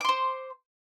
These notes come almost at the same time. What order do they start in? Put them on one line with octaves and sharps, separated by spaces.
D6 C6 C5